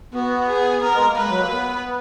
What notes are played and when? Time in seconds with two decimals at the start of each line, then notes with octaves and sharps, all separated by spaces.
0.14 B3 F#4
0.48 G#4
0.83 B3 A#4
0.94 G#3
1.05 A#3
1.17 G#3 B4
1.29 F#3
1.40 A#3
1.52 B3